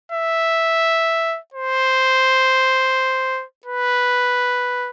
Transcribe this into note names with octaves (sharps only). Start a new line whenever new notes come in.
E5
C5
B4